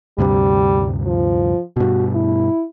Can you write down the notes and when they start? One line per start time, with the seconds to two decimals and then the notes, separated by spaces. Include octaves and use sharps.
0.18 D2 G2 C3 G3
1.06 F3
1.76 G2 B2 F#4
2.14 E4